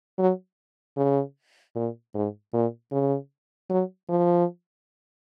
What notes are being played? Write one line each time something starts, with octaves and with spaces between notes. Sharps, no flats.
F#3
C#3
A#2
G#2
A#2
C#3
F#3
F3